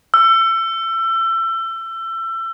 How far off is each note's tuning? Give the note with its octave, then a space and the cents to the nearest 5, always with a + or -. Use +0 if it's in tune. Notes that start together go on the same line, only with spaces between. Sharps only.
E6 +30